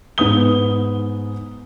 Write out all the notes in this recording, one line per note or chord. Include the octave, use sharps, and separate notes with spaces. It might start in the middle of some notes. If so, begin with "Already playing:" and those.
G#2 B3 D#6 G7